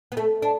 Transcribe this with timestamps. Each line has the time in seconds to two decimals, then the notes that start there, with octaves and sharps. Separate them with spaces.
0.12 B3
0.17 A3
0.42 D4